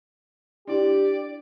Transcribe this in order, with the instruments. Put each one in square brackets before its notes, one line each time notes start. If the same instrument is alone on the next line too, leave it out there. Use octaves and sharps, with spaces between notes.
[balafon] D4 E4 [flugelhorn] G4 [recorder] D5